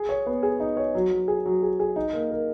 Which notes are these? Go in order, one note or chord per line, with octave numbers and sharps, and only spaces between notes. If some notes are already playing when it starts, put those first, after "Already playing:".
Already playing: G#4
C#5
B3
G#4
D#4
C#5
F#3
F#3
G#4
F#3
G#4
G#4
D#4
A#3
A#4